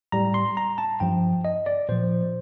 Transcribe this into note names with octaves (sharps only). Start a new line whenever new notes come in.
A2 G3 A#5
C6
A#5
A5
G2 F3 G5
D#5
D5
A#2 F3 C5